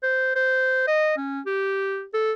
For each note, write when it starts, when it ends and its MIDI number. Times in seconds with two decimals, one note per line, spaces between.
0.03 0.35 72
0.36 0.86 72
0.87 1.14 75
1.17 1.40 61
1.46 2.05 67
2.14 2.33 69